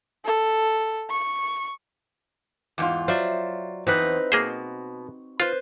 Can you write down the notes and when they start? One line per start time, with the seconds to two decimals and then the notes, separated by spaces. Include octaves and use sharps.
0.25 A4
1.11 C#6
2.78 E2 G#2 F4
3.08 F#3 F4 C5 D5 E5
3.87 E2 C4 D#4 B4
4.32 B2 A#3 G#4 C5
5.40 F4 B4 C5